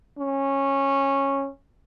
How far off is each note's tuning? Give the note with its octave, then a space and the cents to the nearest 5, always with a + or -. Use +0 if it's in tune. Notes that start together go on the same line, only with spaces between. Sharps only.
C#4 -15